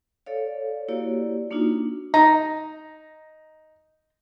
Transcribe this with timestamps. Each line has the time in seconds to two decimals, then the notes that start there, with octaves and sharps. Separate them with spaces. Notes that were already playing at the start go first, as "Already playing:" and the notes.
0.26 A4 C#5 D5 F5
0.88 A#3 E4 F#4 G4 C#5 D5
1.51 A#3 D4 D#4 F4 F#4
2.14 D#4 A#5